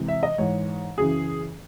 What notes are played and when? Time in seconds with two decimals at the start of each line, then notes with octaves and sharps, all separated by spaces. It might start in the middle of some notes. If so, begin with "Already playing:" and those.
Already playing: C3 E3 G#3
0.08 E5
0.23 D#5
0.38 G#2 E3 G#3 C#5
0.98 F#2 C#3 E3 G#4